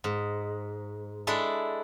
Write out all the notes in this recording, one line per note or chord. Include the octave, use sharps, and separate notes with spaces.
G#2
G#3 D4 E4 A4